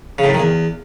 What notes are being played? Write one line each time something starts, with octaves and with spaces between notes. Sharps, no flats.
C#3
A2
F#2
D#3
E2